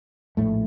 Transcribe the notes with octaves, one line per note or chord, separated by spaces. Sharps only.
A#1 A2 A3